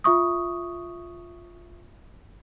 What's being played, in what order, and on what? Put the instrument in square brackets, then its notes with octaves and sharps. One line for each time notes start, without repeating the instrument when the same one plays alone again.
[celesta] F4 E5 C#6 D#6